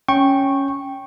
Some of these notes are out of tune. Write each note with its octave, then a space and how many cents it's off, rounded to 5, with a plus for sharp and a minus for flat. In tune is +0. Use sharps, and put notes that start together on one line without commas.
C#4 +0 G5 +0 C#6 -15